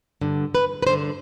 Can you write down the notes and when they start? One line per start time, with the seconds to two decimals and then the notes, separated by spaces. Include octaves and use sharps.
0.21 G2 D3
0.55 B4
0.82 B4
0.87 G2 D3 C5